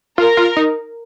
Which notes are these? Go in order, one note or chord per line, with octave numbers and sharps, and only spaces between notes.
F4 A#4
F4
D#4